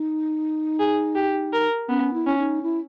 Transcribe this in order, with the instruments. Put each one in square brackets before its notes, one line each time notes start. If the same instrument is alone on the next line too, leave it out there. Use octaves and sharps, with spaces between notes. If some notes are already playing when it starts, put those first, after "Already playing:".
Already playing: [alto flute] D#4
[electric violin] G#4
G4
A#4
[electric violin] B3 [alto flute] C#4
[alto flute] E4
[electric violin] C#4
[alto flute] D#4
E4